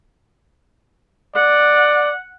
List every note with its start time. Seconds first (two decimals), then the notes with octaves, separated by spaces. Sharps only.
1.35 D5 F#5